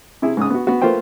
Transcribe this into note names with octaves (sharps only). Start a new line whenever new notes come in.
C3 E4 G#4
G#2 C#3 D#6
B3 F#4
B3 F#4
A3 A#3 F4 B4 C5 G5